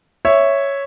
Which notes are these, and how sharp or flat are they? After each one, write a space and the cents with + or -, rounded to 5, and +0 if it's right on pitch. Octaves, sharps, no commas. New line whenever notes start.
C#5 +0 E5 +0